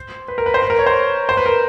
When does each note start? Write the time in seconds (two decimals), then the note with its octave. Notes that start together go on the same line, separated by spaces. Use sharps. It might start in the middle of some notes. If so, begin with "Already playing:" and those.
Already playing: C5
0.28 B4
0.38 A#4
0.46 B4
0.54 C5
0.62 B4
0.70 A#4
0.79 C#5
0.86 C5
1.29 C5
1.37 B4
1.46 A#4